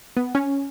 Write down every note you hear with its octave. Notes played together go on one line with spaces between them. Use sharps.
B3
C#4